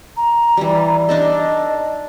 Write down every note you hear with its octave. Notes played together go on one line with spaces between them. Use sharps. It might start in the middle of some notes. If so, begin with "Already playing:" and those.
A#5
E3 G3
D4 D#4 A4 D#5